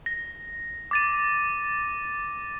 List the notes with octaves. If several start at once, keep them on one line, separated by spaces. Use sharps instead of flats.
A#6
D6 A6 D#7